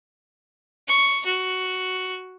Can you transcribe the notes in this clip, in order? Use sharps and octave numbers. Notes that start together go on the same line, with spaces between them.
C#6
F#4